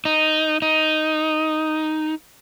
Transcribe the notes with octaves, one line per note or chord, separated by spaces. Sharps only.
D#4
D#4